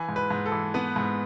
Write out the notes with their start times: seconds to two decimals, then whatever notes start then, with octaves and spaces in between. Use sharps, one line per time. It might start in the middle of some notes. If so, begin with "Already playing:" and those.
Already playing: E3 G#5
0.09 G#2
0.16 B4
0.30 G#2
0.46 A4
0.52 E3
0.74 B3 B4
0.96 G#2